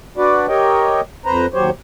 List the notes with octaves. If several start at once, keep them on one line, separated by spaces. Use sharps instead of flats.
D4 F#4 B4 D5
G4 A#4 C#5 D#5 G5
F2 B4 C5 A#5
D#2 F#3 G4 C5 C#5